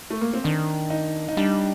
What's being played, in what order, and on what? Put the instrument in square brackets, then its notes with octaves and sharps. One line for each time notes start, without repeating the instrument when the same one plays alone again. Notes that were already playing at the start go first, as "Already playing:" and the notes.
[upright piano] A3
A#3
C4
[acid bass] D#3 [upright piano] D4
[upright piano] D#4
D#4
[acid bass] G3 [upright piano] D4